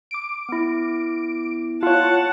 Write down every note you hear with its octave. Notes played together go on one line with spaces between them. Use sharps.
D6 D7
B3 E4
F4 C#5 F#5 A5